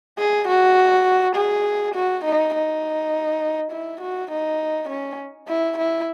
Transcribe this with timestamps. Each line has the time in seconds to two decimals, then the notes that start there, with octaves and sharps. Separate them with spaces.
0.19 G#4
0.48 F#4
1.36 G#4
1.95 F#4
2.25 D#4
2.54 D#4
3.72 E4
4.01 F#4
4.31 D#4
4.89 C#4
5.48 E4
5.78 E4